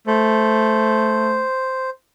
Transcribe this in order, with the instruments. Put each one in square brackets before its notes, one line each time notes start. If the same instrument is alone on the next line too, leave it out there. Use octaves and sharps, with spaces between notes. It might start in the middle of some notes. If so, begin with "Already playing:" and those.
[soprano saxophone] A3 [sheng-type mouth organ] C5